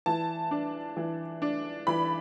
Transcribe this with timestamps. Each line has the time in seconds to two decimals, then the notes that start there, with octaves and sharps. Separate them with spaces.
0.06 E3 A5
0.51 D4
0.97 E3
1.42 D4
1.87 E3 B5